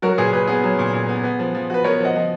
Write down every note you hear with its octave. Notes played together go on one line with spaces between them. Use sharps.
F#3 F#4 A#4
A#2 G#4 B4
A#2 G#4 B4
B3 G#4 B4
F#3
A#2
A#2
B3
B3
F3
F3
F#4 B4
B3 A#4 C#5
F3 D#5 F#5
F3